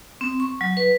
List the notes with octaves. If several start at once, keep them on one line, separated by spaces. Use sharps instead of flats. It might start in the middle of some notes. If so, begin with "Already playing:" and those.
C4
C#6
F#3
B4